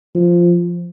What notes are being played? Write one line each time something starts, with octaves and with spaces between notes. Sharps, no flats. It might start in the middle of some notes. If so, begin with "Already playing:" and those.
F3